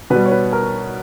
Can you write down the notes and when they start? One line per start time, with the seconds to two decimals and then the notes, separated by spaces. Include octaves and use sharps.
0.10 B2 G3 B4
0.26 C#5
0.32 B4
0.53 A#4